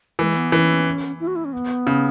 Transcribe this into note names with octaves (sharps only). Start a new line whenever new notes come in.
E3 G#3
B3
E3 C#4
E4
F#4
E4
C#4
B3
C#3